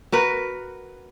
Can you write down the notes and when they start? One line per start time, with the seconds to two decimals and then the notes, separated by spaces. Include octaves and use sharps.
0.12 F#4 A#4 B4